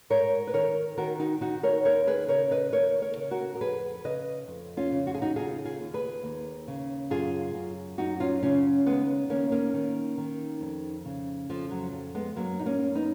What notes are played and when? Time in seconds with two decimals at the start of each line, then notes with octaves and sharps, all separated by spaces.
0.10 G#2 A#4 C#5
0.47 B4
0.54 D#3 A#4 C#5
0.97 D#3 F#4 A#4
1.19 D#4 F#4
1.41 D#3 D#4 F#4
1.63 A#4 C#5
1.85 D#2 A#4 C#5
2.07 G#4 B4
2.28 C#3 A#4 C#5
2.51 B4 D#5
2.73 D#2 A#4 C#5
3.02 A#4 C#5
3.17 C#3
3.31 F#4 A#4
3.55 A#4
3.61 F2 G#4 B4
4.05 C#3 B4 D#5
4.48 F2
4.77 C#4 F4
4.92 C#3
5.07 F#4
5.15 G#4
5.22 D#4 F#4
5.36 D#2 F4 G#4
5.65 F4 G#4
5.79 D#2
5.94 G#4 B4
6.23 D#2
6.68 C#3
7.10 F#2 F4 G#4
7.55 F#2
7.98 F#2 D#4 F#4
8.20 C#4 F4
8.43 C#3 C#4 F4
8.86 D#2 G#3 B3
9.30 D#3 A#3 C#4
9.52 A#3 C#4
9.74 D#3
10.18 D#3
10.61 F2
11.05 C#3
11.49 F2 F3
11.71 F#3
11.93 F2
12.15 G#3 B3
12.36 F#2 F#3 A#3
12.59 D#4
12.66 A#3 C#4
12.80 F#2
12.95 B3 D#4